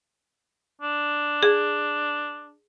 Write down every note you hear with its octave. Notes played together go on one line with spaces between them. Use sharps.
D4
G#4